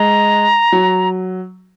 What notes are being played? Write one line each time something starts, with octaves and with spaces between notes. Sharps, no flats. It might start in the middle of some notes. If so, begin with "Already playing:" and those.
Already playing: G#3 A#5
F#3